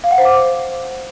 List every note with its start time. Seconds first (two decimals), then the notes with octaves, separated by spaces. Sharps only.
0.04 F5
0.11 F#5
0.18 C5
0.25 D6